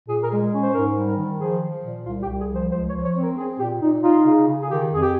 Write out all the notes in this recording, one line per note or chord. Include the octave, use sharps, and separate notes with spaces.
A#2 G#4
A#4
G#3 G#4
C#4
C5
G#2 A#4
G3
A#4
D#3
F3 G#4
F3
A#2
C2 F4
G4
C2
G#4
F3
C5
C#2 C5
C#5
F3
C#5
C4
A#4
C4 G#4
A#2 G4
A#2 D#4
D#4 F4
C#3
C#3
G#4
D#3 G4
F2 G#4
G4